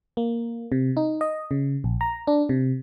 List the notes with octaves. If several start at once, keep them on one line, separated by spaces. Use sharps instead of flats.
A#3
C3
D#4
D#5
C#3
A#1
A#5
D4
C3